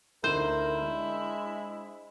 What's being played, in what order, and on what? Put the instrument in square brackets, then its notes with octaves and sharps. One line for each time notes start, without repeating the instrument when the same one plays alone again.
[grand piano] D2 D#4 F#7 [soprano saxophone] E4 [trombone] A#4 [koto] C5
[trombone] G#3 [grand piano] D4